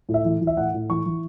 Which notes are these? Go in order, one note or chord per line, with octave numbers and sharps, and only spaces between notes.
A2
E5
E3
E3
E5
A2 F#5
A2
E3 C#6
E3